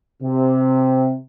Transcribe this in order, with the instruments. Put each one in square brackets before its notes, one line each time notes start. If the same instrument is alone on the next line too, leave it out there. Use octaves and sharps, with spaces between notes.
[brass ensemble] C3